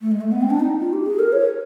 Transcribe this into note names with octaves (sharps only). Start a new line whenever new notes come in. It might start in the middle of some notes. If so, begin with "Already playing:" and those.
A3
G#3
A3
B3
C4
D4
D#4
F4
G4
G#4
A#4
C#5